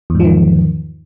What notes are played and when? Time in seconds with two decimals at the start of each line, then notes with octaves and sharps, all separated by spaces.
0.10 E2
0.15 G#2
0.20 F3
0.25 D#3